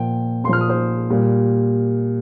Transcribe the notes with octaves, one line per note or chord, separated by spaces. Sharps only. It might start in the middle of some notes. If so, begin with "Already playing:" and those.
Already playing: A#2 F3 G5
A#2 F3 C6 F6
D#6
C5
A#2 G3